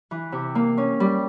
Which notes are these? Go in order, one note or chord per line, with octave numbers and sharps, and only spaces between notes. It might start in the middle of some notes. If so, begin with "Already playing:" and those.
E3
C3
A#3
C#4
G3